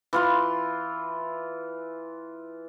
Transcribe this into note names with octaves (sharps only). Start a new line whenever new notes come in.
E3 F4 C6